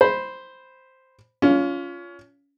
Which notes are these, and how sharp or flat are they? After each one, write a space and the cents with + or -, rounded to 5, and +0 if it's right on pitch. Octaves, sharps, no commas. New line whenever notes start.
C5 +0 B5 +0
C#4 +25 F4 +0